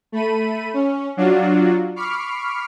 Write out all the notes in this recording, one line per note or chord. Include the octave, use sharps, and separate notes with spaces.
A3 B5 D#7
C#4
F#3 D4 F4 F#4
B5 C#6 D6 F6 C7